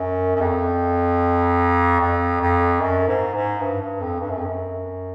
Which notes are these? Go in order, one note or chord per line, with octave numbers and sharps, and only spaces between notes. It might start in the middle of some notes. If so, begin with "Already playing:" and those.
Already playing: F#2
F#2
F2
F2
F2
F#2
G#2
G#2
G2
G2
F2
G2
F#2
F2
F#2